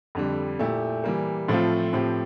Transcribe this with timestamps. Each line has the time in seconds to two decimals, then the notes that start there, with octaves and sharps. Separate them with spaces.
0.15 F2 D3 G3
0.59 A#2 A3 E4 G4
1.04 E3 G3 A#3
1.48 A2 F3 A3 C4 F4
1.93 A2 F3 C4 G4